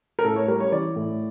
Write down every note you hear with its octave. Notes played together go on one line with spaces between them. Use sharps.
A#4
A2 A4
C#5
G3 A#4
C#5
E3 D5
A2